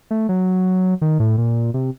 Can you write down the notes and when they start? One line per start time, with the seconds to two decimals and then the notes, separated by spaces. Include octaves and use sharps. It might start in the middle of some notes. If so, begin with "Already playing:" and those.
0.11 A3
0.29 F#3
1.02 D#3
1.20 A2
1.38 A#2
1.74 C3